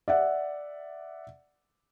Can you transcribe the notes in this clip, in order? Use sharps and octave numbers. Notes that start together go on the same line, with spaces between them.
D5 E5 F#5